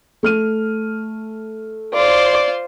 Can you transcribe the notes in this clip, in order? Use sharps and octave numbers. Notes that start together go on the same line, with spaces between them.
A3 F6 D#7
F4 C5 D5